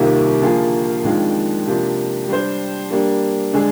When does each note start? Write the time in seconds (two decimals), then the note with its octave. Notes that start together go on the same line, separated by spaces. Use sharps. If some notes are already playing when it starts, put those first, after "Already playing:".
Already playing: C2 C3 D#3 A#3 F4
0.41 D3 F3 A#3 F4 G#4
1.03 F2 D#3 G#3 D4 F4
1.67 C3 F3 A#3 D4
2.28 G3 D4 G4 C5
2.90 G3 A#3 D4
3.53 D3 G#3 D4 G#4